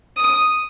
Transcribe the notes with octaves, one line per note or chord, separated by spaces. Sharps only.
D#6